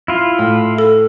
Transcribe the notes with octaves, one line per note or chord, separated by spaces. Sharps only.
E4 F4
A2
A4